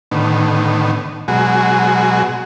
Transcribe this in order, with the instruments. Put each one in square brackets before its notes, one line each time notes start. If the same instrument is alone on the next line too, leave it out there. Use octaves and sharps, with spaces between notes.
[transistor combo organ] A2 D3 D#3 B3
B2 F#3 G#3 F#4 G#4